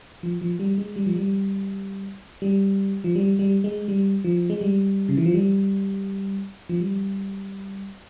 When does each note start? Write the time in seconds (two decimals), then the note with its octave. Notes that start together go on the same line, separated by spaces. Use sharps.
0.23 F3
0.42 F3
0.59 G3
0.78 G#3
0.96 G3
1.06 F3
1.16 G3
2.42 G3
3.04 F3
3.16 G3
3.39 G3
3.64 G#3
3.88 G3
4.25 F3
4.50 G#3
4.61 G3
5.09 C#3
5.17 E3
5.26 F3
5.34 G3
6.69 F3
6.80 G3